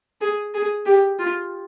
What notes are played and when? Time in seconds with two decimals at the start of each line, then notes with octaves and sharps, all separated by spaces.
0.21 G#4
0.54 G#4
0.86 G4
1.19 F4